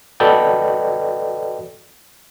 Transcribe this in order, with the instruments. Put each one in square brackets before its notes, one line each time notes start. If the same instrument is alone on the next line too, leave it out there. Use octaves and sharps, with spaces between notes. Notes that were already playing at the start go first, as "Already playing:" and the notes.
[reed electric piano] F#4 A4 B4 D5 D#5 G5